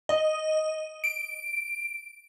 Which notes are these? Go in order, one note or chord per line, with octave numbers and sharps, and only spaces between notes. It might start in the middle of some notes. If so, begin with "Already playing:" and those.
D#5
D7